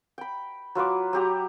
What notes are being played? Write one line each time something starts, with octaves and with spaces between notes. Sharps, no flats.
G5 B5
F#3 F4 B4 D6
F#3 G4 A#5